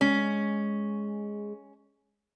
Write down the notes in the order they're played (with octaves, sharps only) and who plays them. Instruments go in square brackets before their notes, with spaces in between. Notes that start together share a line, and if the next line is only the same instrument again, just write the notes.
[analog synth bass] G#3 [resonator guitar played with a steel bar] C#4